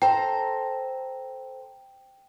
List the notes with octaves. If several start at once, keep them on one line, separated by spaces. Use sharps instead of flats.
A4 C5 G5 A#5